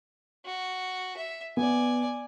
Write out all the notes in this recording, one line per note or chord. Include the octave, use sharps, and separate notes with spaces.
F#4
E5
B3 D5 G#5